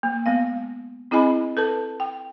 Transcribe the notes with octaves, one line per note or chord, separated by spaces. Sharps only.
A#3
G#3 B3 F5
C4 E4 G#4 D#5 G#5 B5
A4 B4 A5
G5